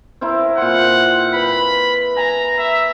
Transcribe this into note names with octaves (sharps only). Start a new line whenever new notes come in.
C4 E4 A#4
A#2 C5 F#5
B4 B5
G#5 A#5
E5